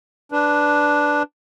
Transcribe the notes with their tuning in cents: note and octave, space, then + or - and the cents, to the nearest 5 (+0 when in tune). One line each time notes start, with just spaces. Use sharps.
D4 +0 B4 +0